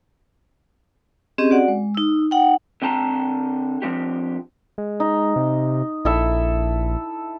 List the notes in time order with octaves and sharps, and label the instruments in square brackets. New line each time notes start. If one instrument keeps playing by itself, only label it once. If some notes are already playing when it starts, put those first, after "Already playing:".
[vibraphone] C4 C#4 G4 G#4 D#5
F#4 D5 F#5
G#3
D#4 E6
D#4 F#5 G5
[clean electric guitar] D3 C4 G5 A5 A#5
F3 C4 D4 G4
[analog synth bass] G#3
[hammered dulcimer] D#4
[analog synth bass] C3
[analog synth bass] A#1 [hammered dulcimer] E4 A4 E5